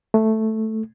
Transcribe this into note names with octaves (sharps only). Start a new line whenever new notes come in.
A3